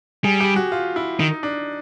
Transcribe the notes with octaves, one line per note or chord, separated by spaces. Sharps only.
G3 G#4
G4
F#4
F4
E4
D#3 D#4
D4